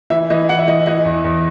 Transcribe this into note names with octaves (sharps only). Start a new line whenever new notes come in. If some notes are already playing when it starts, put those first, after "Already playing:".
E3 E5
E3 D#5
E3 F#5
E5
E3 D#5
E3 D#5
E2
E2